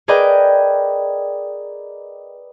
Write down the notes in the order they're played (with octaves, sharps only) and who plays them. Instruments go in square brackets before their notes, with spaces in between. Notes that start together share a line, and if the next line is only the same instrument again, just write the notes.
[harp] G#4 A#4 B4 D5 D#5 G5